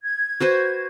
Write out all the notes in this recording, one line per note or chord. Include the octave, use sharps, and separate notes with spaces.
G#6
F#4 B4 C5